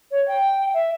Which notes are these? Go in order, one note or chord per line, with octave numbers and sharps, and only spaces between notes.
C#5
G5
E5